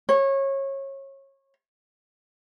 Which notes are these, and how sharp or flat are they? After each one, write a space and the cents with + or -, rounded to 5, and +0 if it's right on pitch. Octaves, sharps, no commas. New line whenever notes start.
C#5 -25